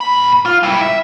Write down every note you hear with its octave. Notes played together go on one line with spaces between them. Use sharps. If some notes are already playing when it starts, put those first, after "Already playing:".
A#2 B5
F4
G3 E4
E5